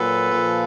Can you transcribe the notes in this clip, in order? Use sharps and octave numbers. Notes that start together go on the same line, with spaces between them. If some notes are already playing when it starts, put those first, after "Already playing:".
Already playing: A#2 F#3 A4 B4
A#2 F3